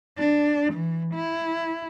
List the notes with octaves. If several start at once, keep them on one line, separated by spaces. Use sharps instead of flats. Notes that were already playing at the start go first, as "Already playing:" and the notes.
D4
E3
E4